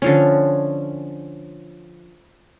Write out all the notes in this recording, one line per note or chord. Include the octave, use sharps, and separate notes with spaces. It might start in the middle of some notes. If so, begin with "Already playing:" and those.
D3 F3 C#4